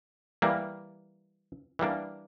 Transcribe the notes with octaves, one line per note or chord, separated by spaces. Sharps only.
E3 G3 A#3
E3 G3 A#3 D4